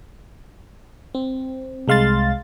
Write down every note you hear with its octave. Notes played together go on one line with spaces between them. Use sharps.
C4
C2 G#3 F5 C6 A6